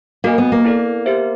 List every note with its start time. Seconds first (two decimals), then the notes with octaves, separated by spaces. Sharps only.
0.24 A#3 F#4 A#4 D#5 G#5
0.38 B3
0.52 A#3
0.65 E4 A4 D5
1.06 G4 C5 E5